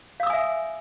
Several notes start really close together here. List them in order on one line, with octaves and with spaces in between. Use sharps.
F5 E6 D#6 G#5 E5